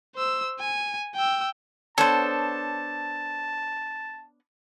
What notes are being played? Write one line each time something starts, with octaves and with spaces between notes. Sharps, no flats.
C5 E6
G#5
G5 E6
B3 D4 A4 C5 C#5 A5